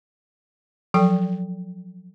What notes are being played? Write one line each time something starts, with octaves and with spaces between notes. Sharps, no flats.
F3 F#3 A4 G5